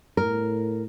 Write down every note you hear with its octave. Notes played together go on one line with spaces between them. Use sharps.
A2 A#4